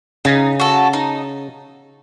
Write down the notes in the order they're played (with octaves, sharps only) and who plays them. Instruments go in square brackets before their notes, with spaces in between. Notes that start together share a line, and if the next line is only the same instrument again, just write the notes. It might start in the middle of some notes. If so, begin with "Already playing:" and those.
[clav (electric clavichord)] C#3 [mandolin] D#4
[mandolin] F#4 A4
D#4